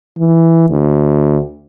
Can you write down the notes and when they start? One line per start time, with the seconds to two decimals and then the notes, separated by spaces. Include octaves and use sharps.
0.18 E3
0.70 D2